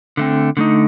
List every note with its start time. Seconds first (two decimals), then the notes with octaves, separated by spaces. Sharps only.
0.17 D3 A3 C4
0.57 D3 A3 D#4